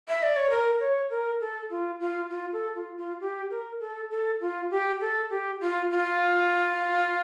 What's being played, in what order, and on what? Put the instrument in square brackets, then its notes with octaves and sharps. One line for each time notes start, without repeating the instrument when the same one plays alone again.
[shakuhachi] E5
D5
C#5
A#4
C#5
A#4
A4
F4
F4
F4
A4
F4
F4
G4
A#4
A4
A4
F4
G4
A4
G4
F4
F4